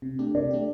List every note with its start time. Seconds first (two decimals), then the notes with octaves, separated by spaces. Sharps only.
0.02 C3
0.19 A3 D4 G4
0.35 C3 D5
0.51 A3 D4 G4